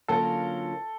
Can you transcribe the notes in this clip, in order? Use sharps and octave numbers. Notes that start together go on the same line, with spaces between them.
D3 F#3 A#3 C#4 F4 A4